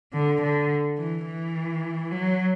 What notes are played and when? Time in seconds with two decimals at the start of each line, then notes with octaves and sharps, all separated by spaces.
0.13 D3
0.42 D3
0.98 E3
1.26 E3
2.11 F#3